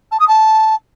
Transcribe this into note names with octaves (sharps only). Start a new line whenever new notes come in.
A5
D#6
A5